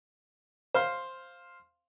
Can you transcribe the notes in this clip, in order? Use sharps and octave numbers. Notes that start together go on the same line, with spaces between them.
C5 F5 C6